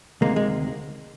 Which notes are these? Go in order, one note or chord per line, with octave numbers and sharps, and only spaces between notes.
D2 C3 D#3 G#3 A#3
G#3